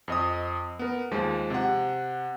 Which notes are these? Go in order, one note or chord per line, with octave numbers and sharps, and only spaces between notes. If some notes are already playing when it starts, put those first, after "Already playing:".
F2 D#5 D#6
B3 A#4
D#2 F3 G#3
C3 F#5